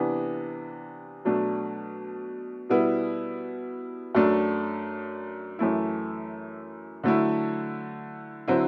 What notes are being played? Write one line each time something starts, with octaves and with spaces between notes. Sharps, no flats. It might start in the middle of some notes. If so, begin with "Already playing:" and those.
Already playing: C3 E3 B3 D4
B2 F#3 A3 D4
B2 G3 B3 E4
F#2 F#3 A3 D4
F#2 E3 A3 E4
D3 F#3 A3 E4
D3 F#3 C4 E4